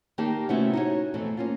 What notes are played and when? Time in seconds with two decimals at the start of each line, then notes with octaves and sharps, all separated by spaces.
0.18 D#3 A#3 D#4 G4 G5 A5
0.49 C3 A3 B3 C#4 E4 F#4
0.73 D#4 F#4 C#5
1.14 F2 B2 E3 A3 C4
1.37 A#3 C#4 F4